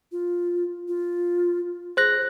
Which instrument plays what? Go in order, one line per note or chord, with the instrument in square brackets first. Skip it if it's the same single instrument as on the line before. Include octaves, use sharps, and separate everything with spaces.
[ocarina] F4
F4
[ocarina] G#4 [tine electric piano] C5 F#6 A#6